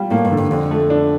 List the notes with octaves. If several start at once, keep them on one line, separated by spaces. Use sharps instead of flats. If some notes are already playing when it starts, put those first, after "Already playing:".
Already playing: G3 F4
A2 A#3
G2
D3
G2
F2 D3
A3
D4